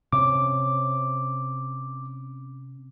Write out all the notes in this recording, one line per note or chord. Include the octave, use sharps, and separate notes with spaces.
C3 C#4 D6